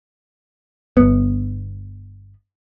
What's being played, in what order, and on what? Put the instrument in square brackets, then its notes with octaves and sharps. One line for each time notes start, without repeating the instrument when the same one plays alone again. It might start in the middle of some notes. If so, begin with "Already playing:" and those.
[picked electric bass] G1 B3